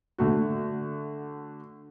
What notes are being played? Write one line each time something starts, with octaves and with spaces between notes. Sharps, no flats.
D3 A3 F#4